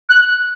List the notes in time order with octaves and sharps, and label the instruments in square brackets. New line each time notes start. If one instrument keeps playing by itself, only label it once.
[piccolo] F#6